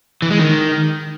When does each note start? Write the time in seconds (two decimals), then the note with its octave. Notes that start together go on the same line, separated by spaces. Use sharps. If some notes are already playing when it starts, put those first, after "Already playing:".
0.22 E3
0.31 G#3
0.39 D#3